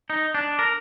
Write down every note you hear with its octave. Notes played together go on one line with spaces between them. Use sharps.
D#4
D4
A#4